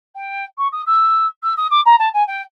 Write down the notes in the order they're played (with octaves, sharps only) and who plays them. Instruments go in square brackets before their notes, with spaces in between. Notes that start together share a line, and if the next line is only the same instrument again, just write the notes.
[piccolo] G5
C#6
D#6
E6
E6
D#6
D6
A#5
A5
G#5
G5